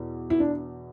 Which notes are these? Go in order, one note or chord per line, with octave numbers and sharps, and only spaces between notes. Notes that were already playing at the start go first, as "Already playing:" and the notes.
Already playing: E2 B2
E4
D4